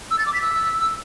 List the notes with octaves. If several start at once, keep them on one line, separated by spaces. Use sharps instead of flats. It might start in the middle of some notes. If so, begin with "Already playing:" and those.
E6
A6
D6
B6
E6